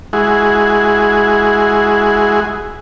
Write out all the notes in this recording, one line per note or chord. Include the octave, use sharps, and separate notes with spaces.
G#3 E4 F#4 G#4